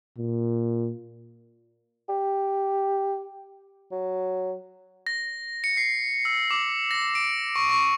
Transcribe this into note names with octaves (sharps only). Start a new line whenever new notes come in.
A#2
G4
F#3
A#6
C#7
C7
E6
D6
A#6
D7
C#6
C#6